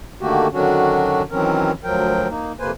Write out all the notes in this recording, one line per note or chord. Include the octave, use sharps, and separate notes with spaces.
D3 D#3 A3 A#3 F#4 G4
D3 D#3 F#3 C#4 D4 F#4
D#3 E3 F#3 C4 C#4 A#4
D2 F3 F#3 A#4 G5
A#3 D#4
F2 C3 A#3 B4 C5 G#5